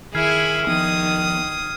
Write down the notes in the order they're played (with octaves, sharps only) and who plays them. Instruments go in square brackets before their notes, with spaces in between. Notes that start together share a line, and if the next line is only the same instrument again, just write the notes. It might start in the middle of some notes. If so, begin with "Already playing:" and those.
[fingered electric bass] D#3 [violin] E4 B5 [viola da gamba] G#4 [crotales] F6 G#6 C7
[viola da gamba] D#3 [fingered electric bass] F3 B3 [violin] D#6